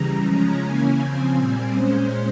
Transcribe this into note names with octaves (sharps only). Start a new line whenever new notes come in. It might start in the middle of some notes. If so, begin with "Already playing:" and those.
Already playing: C#3 E3 G3 A#5
C#3 F3 G#3 C#4 A#5
C#3 E3 A#3 C#4 G#5
C#3 F3 C4 G#5
A#2 G3 C4 G#5
A#2 G#3 C#4 C5